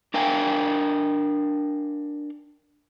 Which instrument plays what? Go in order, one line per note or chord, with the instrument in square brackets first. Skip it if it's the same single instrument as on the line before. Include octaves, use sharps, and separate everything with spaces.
[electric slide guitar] D4 A#4 F5 G5 G#5